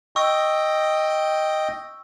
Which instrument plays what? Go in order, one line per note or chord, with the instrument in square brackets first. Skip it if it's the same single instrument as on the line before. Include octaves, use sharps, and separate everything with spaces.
[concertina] D#5 G5 [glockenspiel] C#6 E6